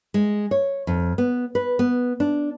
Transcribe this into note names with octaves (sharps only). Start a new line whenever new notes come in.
G#3
C#5
F2
B3
B4
B3
D4